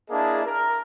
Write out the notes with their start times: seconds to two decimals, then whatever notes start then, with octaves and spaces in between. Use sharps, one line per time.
0.10 A#3 D4 E4 G#4 D#5 A5
0.45 A#4